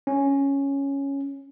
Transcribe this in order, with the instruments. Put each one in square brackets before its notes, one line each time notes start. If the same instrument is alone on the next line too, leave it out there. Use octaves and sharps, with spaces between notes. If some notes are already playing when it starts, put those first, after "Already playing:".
[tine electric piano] C#4